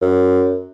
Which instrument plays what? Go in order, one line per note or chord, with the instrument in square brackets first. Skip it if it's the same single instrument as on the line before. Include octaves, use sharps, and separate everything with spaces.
[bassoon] F#2